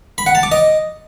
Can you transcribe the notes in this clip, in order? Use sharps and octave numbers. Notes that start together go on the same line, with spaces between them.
B5
F#5
A5
D6
D#5